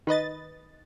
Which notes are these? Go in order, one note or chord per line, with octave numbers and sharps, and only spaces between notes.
D#3 B4 D#5 A6